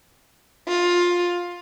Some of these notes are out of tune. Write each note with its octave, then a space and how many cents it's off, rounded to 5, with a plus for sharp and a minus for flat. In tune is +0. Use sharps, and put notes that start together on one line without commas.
F4 +15